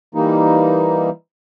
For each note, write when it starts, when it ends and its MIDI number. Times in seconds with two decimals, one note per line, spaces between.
0.15 1.10 52
0.15 1.10 55
0.15 1.10 58
0.15 1.10 63